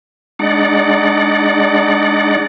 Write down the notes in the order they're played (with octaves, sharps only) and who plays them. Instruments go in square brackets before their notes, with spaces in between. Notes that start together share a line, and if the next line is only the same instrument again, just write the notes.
[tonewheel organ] G#3 D4 D#4 D5 F#5